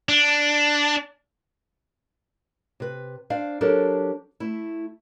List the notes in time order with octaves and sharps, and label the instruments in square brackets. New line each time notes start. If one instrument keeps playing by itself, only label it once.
[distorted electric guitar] D4
[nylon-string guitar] C3 B4
D4 C5 D5 F5
F#3 D4 G4 A4 A#4 C5
A3 E4